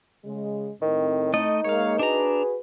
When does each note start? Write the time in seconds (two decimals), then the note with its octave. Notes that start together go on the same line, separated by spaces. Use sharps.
0.25 C#3 G#3
0.82 A2 D#3 C4
1.34 A3 D#4 D#5
1.64 G#3 A#3 C#5 F5
1.99 D4 F#4 G#4 B4 A#5